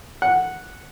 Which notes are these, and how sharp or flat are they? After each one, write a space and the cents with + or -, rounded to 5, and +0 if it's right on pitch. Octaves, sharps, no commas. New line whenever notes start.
F#5 -5